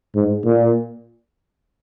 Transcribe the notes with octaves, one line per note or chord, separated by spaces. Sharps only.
G#2
A#2